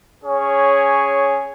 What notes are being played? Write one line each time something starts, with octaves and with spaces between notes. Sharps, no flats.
C#4 G#4 C#5